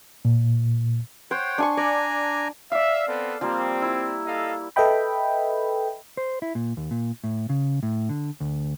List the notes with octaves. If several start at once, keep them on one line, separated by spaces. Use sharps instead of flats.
A#2
C5 C#5 F#5 G5
D4 G#5 C#6
D4 D5 G#5 A#5
D5 E5 F5
B3 C4 A4
F3 G3 A#3 C4
E4
A4 D#5 F5
A4 B4 D#5 E5 G5 B5
C5
E4
A#2
D#2
A#2
A2
C#3
A2
D3
D2